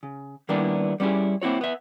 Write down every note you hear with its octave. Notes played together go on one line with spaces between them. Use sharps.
C#3
D#3 G3 A#3 B3 D4 E4
G3 B3 C#4 E4 G4 G#4
A#3 C4 E4 F#4 C#5
B3 E5